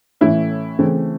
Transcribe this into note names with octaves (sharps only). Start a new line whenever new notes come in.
A2 E3 A3 C#4 E4
C#3 E3 A3 C4